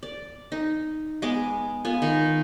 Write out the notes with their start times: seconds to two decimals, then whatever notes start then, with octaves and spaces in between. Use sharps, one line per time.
0.03 D5
0.52 D#4
1.22 G#3 B3 G#4 D6
1.85 B3 F4 G#5
2.02 D#3